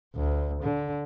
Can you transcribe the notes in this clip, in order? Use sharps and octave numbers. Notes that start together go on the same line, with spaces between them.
D2
D3